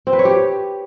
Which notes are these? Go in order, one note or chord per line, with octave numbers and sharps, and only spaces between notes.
C4
B4
C#5
G4